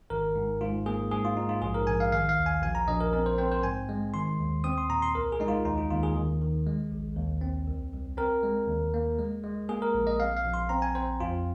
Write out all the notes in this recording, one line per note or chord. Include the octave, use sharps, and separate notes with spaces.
G#1 A#4
G#2
G#2 F4
A#3 G#4
G#2 G#4
F4
G#2 D#4
F4
A#1 G#4
A#4
A#1 G#5
F5
D#3 F5
F5
D#2
G#5
A#1 G#5
A#5
A#1 D#5
A#4
C4 A#4
C5
C4 C5
C5
G#2 G#5
G#3
D#3 C6
D#2
C4 D#6
C6
A#2 A#5
C6
C2 A#4
G#4
G#3 D#4
F4
D#2 D#4
F4
D#2 F4
G#4
D#3
D#3
G#3
A#1
D#2
C4
C2
C2
C4 A#4
G#3
D#2
A#3
G#3
G#3
A#3 G#4
A#4
A#1
D#5
C4 F5
F5
A#1
C6
C4 A#5
G#5
C4 C5
F2 F4